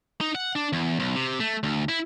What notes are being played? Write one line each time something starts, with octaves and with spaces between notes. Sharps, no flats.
D#4
F#5
D4
E2
B1
C3
A3
D2
E4